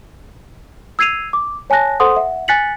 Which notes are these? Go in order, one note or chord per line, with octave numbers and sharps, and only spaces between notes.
E6 G#6 C7 D#7 F7
D6
C#5 G#5 A5 F#6 A#6
A4 C5 F#5 C6 D#6
E5 F#5
G#5 F#6 A6 B6 C#7 F#7